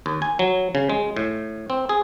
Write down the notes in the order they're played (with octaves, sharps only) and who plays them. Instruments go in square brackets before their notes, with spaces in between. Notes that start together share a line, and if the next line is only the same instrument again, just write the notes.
[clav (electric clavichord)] D#2
G#5
F#3
C#3
G#3
A2
C4
G#4